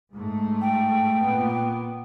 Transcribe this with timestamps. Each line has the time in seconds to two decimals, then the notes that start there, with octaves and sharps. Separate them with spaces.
0.13 G#2 A3
0.62 G5
1.23 A#2 B3